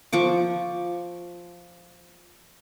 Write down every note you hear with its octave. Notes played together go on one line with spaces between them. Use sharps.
F3 C#6 D6